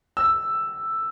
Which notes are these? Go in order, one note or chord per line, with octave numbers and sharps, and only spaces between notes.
E6